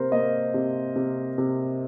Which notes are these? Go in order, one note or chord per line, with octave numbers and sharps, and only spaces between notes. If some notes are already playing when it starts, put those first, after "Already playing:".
Already playing: C3 A#3 A#4 C5
A#3 D#5
C3
C3
C3